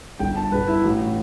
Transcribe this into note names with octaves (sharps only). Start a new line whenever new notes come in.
G1 G2 D3 G5
A5
G1 G2 D3 B4
E4
A1 A2 E3 F#4